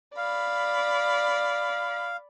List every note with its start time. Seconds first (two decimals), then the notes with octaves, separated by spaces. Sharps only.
0.17 D5 F5 B5